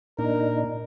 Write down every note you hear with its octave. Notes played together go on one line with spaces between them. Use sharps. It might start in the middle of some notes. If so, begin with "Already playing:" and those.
A#2 D4 D#4 A#4